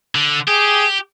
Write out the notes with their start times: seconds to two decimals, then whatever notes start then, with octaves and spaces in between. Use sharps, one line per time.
0.15 D3
0.48 G4 G#4